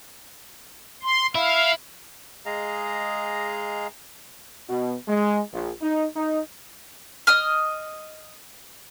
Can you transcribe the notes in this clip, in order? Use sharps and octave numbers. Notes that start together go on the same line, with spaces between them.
C6
E4 F5
G#3 G#4 D#5 F5 A#5
B2
G#3
A#1
D#4
D#4
D#5 D#6 F6